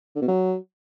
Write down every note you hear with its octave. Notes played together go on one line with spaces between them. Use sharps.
D3
B2
F#3